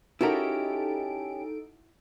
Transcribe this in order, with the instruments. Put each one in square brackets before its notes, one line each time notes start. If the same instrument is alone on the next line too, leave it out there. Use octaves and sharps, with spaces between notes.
[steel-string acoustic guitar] C#4 G4 [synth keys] D#4 A4 D7 [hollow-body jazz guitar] E4 F#4 A#4